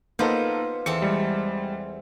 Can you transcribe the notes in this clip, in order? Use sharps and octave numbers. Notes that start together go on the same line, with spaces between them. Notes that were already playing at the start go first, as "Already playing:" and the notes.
A#3 B3 D#4 F4 A4 C5
E2 C4 A4 C#7
G3 G#3